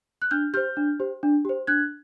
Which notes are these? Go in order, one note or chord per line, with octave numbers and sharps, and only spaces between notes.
F#6
D4 F6 G6
G4 C5 F6 G6
D4
G4 C5
D4
G4 C5
D4 F#6 G#6